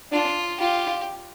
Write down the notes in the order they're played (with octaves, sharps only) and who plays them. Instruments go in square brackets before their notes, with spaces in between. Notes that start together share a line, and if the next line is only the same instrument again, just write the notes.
[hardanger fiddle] D4 [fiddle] F4
[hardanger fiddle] F4 [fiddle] G4